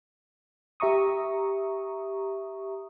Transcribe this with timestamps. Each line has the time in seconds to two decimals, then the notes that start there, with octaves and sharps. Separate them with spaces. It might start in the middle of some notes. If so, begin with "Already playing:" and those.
0.80 G4 E5 A#5 C#6 D#6